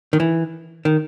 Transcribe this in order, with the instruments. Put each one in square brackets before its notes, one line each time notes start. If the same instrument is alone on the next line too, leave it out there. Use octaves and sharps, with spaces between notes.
[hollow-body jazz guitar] D#3
E3
D#3